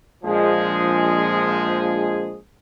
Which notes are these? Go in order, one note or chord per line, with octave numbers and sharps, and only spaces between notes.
A#1 F3 G#3 G#4